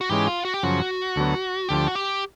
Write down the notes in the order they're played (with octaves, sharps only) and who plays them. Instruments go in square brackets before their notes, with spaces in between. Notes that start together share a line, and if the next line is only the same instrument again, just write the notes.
[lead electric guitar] F#4
[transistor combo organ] G#2 E3 G#3 C#4 [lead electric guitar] G4
[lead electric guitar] F4
F#4
G4
[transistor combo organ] F#2 C#3 F3 [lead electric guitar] F#4
[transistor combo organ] D2 D3 F#3 B3
[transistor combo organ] D2 D3 F3 [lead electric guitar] G4
[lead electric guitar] F#4
G4